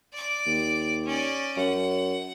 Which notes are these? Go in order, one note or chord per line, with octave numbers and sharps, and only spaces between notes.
D5 D6
D#2
C#4 D5
F#2 F#5